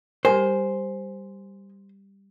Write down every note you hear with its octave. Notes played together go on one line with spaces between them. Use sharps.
G3 G4 A#4 C5 G#5